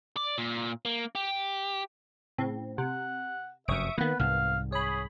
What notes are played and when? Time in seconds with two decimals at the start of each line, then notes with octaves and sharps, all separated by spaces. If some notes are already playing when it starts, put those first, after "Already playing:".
0.17 D5
0.38 A#2
0.85 A#3
1.15 G4
2.38 A2 C#3 C4
2.78 C3 F#5
3.68 F1 F#2 E5 C#6 D#6 D7
3.98 D3 D#3 A#3 B3 B4
4.19 C2 G#2 F5
4.72 G#4 C#5 B5